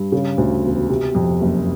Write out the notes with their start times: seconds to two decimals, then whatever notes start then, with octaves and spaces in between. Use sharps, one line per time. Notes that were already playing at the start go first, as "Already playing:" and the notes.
Already playing: G2
0.12 C#3
0.38 D2
0.64 E1
0.89 C3
1.15 F2
1.41 F#1